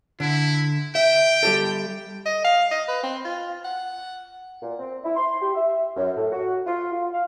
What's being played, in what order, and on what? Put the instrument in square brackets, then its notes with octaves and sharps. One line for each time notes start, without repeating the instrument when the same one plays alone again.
[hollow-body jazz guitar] D3 [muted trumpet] E4
[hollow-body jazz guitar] E5 [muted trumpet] G5
[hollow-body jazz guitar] G3 G4 A4
[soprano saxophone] D#5
F5
D#5
B4
C4
F4
F#5
[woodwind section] A#2
C4
E4
C6
G4
E5
F#2
A2
F#4
F4
F4
F5